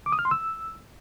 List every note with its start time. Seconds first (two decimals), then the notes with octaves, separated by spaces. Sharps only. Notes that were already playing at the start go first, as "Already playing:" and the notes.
0.06 D6
0.12 D#6
0.19 F6
0.25 C6
0.31 E6